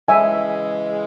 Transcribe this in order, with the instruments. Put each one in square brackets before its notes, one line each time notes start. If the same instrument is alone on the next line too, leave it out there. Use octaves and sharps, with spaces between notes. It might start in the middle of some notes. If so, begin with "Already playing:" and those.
[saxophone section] C#3 E3 G#3 [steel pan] E5 G#5